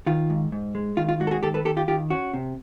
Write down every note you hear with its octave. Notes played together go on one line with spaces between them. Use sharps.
D#3 F4
G#2
G#2
G#3
D#3 F4
F4
G#2 F#4
A4
F#4 G#4
D#3 G4 A4
A4 B4
D#3 G4 A4
F4 G4
D#3 F4 G4
C#4 F#4
C3